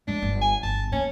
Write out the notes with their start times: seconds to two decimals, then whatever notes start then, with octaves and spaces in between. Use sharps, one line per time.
0.08 G#3 A3 D4
0.22 G1
0.42 G#5
0.63 G1 A5
0.92 A#3 C#4